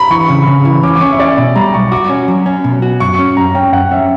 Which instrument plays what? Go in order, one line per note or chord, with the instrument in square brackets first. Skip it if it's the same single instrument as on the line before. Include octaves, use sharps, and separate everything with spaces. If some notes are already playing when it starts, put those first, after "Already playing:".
Already playing: [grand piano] A#5 B5
[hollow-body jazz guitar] E3 [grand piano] C#6
[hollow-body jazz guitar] C#3 [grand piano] C#6
[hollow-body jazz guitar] C#3
E3
[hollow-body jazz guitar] C#4 [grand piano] D6
[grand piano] D6
[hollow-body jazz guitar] C#4 [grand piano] C#6
[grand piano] E5
[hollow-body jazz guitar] C#4 [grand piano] D5
[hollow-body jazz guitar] B2
[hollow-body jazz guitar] G3 [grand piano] A#5
[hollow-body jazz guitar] B1 [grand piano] C#6
[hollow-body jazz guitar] F#4 [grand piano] D6
[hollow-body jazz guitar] C#4
F#3
C#4
B2
F#4
[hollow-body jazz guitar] F#2 [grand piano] C#6
[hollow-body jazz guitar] C#4
[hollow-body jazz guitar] F#2 [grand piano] A#5
[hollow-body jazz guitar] C#4 [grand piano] G5
[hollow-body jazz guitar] F#2 [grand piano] F#5
[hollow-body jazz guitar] C#4 [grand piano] E5